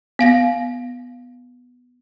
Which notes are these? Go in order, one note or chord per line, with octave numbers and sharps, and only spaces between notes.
B3 F5 A#6